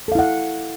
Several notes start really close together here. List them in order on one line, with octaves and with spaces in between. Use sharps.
A4 F5 E4 F#5